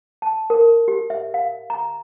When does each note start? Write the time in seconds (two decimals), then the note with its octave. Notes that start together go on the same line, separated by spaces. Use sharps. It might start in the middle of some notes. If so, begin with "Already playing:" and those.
0.22 A5
0.50 A#4
0.88 G4
1.10 E5
1.34 F5
1.70 A#5